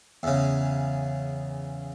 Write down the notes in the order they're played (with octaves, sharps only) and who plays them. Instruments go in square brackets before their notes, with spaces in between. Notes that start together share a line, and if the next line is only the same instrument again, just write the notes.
[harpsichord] E2 C#3